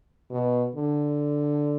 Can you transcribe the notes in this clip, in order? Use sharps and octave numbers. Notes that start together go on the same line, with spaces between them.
B2
D3